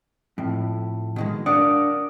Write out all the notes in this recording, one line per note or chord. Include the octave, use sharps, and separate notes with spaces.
F2 A2
B2 D#3 G#3
D4 A#4 D5 F5 F#5 D#6